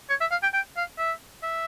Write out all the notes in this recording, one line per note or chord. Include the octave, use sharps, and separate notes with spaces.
C#5
E5
F5
G5
G5
F5
E5
E5